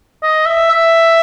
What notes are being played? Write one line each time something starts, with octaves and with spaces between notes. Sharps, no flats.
D#5
E5
E5